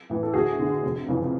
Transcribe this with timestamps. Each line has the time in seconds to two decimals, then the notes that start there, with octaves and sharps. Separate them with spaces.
0.10 A2 E3
0.23 A4
0.34 D2 F#4 G#4
0.59 D3
0.83 F1
1.08 F2 C#3 E3